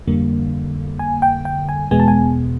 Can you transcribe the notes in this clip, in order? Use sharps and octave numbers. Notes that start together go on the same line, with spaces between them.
F2 D3 G3 A#3
G#5
G5
G5
G#5
E2 B2 G#3 B3 G#5
A5
G#5